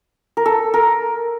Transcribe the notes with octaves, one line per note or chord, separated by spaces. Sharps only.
A#4
A4
A#4